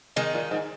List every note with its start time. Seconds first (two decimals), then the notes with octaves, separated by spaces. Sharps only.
0.16 D#3 G#3
0.34 A#2
0.51 G#2